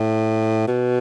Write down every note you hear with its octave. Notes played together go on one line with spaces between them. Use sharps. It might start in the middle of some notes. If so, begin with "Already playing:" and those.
Already playing: A2
B2